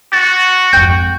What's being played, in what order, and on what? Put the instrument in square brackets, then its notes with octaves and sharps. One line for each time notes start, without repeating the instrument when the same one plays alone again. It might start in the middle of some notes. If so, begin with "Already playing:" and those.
[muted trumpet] F#4 [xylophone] A6
[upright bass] G#1 F2 [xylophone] G5 G6